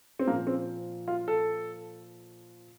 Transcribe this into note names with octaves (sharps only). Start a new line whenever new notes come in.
C4
A#2 F3 A#3
C4
F4
A4